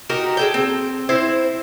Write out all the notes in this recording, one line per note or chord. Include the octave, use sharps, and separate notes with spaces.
D#4 F#4 G4 A#4
G#4 A4 G5
C4
C4 E4 C5